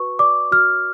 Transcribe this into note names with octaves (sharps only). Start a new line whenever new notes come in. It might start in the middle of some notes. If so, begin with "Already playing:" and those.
Already playing: F#4 B4 C#6
D5 D6
F#4 F6